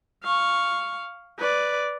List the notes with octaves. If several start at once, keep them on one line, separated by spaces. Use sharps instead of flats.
F5 C#6
B4 D5